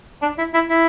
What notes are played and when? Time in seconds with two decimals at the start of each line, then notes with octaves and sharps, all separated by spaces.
0.22 D4
0.38 E4
0.54 E4
0.69 E4